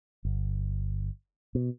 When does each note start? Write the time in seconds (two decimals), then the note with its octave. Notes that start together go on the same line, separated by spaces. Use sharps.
0.25 G1
1.55 B2